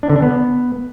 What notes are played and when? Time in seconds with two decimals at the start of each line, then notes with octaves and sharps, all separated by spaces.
0.03 D4
0.10 D3
0.16 D4
0.22 B3